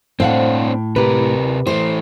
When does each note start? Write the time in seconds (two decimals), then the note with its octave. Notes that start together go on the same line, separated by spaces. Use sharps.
0.20 A2 C4 D4 C5 F5 F#5
0.96 C3 G4 A#4 B4
1.67 E3 A3 C5